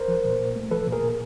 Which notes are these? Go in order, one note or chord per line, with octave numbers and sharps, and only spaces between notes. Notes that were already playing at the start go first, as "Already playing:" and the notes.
Already playing: A#4 C5
F3
A#2
A#2
A3
F3 A4 B4
A#2
G#4 A#4
A#2